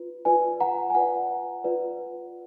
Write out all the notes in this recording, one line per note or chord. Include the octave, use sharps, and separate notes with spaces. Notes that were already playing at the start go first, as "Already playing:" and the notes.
Already playing: F4 B4
F4 B4 D5 G#5
F#5 A#5
G#5
F4 B4 D5 F#5
F4 B4 D5